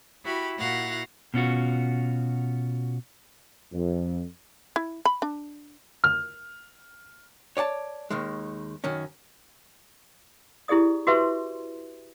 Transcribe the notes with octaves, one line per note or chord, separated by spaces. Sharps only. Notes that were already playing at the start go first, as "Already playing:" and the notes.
E4 F#4 G4 B5
A#2 E4 F#4 F5 F#5 A#6
B2 C#4 F4 F#4
F2
E4
B5
D4
F6
C#5 D5 F#5 A5
D#2 D#3 G#3
F#2 D#3 C#4
E4 G4 G#4 D5 D#6
F#4 G4 B4 C5 E5 C6